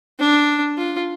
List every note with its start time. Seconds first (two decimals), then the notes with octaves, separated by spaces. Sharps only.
0.19 D4
0.78 F4